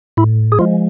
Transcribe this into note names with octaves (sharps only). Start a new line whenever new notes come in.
A2 E4
G#4
F3 G#3 F4